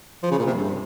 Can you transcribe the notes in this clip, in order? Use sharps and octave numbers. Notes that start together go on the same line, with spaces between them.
F3
C#3
A#2
C3
G2